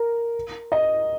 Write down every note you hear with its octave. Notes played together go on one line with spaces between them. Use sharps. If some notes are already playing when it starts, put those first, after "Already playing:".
Already playing: A#4
D#5